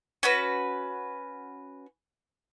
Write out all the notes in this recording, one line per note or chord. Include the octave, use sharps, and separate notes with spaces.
C#4 F#4 B4